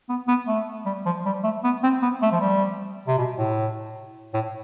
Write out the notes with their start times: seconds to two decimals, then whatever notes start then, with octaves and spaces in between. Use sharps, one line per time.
0.09 B3
0.28 B3
0.47 A3
0.86 G3
1.06 F3
1.26 G3
1.44 A3
1.64 B3
1.83 C4
2.02 B3
2.22 A3
2.32 F3
2.40 G3
3.07 C3
3.18 B2
3.38 A2
4.34 A2